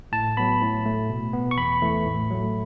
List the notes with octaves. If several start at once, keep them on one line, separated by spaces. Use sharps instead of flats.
A2 A5
F#3 B3 B5
A2
A3
B2
B3
C#6
E2 B5
E3 A3
A2
F#3 A3